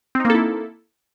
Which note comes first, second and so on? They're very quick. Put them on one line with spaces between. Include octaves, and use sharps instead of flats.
C4 D#4 A#3 A4 E4